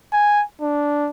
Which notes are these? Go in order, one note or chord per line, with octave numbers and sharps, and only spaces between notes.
G#5
D4